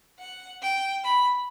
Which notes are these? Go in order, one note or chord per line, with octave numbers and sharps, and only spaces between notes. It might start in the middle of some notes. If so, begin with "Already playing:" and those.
F#5
G5
B5